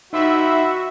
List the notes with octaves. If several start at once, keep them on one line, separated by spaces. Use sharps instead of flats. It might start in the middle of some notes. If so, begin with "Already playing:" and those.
D#3 F3 D#4 F#4 E5 B5